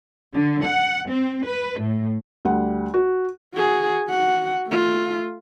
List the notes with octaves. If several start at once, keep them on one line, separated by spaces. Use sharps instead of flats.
D3
F#5
C4
B4
A2
D2 G3 F#5
F#4
F#4 G#4
F#4 F#5
A3 F4